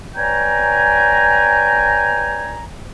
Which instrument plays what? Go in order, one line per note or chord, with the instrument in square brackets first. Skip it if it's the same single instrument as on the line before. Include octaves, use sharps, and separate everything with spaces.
[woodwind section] B4 C#5 D5 G5 G#5 A#5